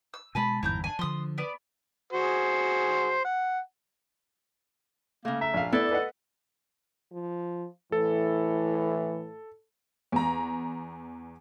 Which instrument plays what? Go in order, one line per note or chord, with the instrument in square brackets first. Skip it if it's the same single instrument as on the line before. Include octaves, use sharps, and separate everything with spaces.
[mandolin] E6
[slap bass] B2 G#3 [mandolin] G#5 A5 B5
[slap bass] G1 E2 G#2 [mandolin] E4 A#5 G6
[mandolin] D4 G#5
[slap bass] D3 F3 [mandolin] C6 D#6
[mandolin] B3 D5
[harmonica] F#4 G#4 C5
F#5
[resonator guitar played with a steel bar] C#3 A3 [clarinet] A#3
[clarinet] E5 [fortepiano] A#5
[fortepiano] A#1 F5
[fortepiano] B3 [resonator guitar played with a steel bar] E4 D5 [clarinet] A4
[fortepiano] B4 D#5 F#5
[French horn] F3
[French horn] A2 [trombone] E3 [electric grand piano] A4
[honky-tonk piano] E2 A#5